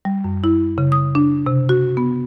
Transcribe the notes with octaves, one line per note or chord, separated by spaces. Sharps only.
G3
F#2
E4
C#3
D#6
D4
C3
F#4
B3